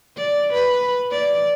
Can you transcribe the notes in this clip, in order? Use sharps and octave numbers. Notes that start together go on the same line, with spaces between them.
D5
B4
D5